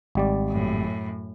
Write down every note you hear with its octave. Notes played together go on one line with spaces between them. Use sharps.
G#1 G3 D5
F#2 A2